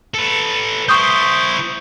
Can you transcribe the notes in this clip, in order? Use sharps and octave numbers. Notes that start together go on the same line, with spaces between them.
A4 B4
E4 C5 C#6 D#6 G6